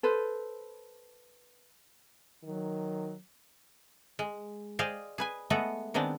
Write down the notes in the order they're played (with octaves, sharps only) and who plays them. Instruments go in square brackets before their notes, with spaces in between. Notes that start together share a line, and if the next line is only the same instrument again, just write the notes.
[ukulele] A4 B4 C5
[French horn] D#3 [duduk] F#3
[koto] G#3
G#4 C5 D5 D#5 F5 G5
G#4 B4 G#5
G#3 A3 B3 A4 D#5 F#5
D#3 G#3 B3 C4 D4